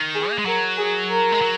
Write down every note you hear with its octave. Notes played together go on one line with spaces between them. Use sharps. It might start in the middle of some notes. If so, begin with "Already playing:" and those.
Already playing: D#3
G#4
A#3
G#3
F#3 A#4
G#4
A#4
G#3
F#3